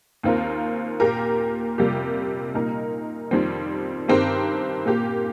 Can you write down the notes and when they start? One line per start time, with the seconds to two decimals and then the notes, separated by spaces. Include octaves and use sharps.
0.23 D#2 D#3 C4 F4 A#4
1.00 A#2 A#3 G4 A#4
1.78 F2 C3 G3 A#3 G4
2.54 A#2 A#3 D#4 A#4
3.31 F2 D#3 G3 C4
4.08 G2 D#3 C4 G4 A#4
4.85 A#2 A#3 G4